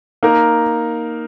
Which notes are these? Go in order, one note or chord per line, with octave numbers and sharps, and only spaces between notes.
A#3 D#4 A#4